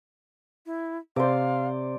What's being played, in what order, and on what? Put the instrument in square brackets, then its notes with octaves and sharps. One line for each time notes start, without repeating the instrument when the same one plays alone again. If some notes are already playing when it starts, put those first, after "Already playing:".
[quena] E4
[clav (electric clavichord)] C3 [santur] C5 D5 [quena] F5